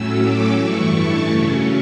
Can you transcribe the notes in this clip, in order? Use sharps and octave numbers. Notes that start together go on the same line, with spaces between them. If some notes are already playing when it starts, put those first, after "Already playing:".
Already playing: A2 F#3 A3 C#4 E6
D6
G2 E3 A3 E4 C#6
A5
C#3 F#3 A3 C#4